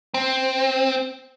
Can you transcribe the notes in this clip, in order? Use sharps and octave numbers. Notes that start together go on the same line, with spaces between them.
C4